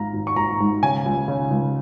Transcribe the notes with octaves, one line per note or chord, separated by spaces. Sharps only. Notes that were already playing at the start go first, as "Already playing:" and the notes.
Already playing: G#1 G#2 F5 A#5
G#1
C#6
G#1 A#5
G#2
C#3 G#5
C#2
C#3
C#2